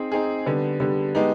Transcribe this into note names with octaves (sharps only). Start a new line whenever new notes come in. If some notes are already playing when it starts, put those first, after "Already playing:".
Already playing: C4 D#4 G#4
C4 D#4 G#4
D3 G3 B3
D3 G3 B3
G#3 B3 D#4 G4